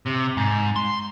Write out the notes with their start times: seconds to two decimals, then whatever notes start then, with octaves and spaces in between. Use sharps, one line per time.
0.06 C3
0.37 G#2
0.76 C6